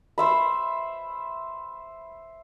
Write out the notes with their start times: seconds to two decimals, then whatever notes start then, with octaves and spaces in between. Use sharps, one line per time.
0.18 C5 E5 B5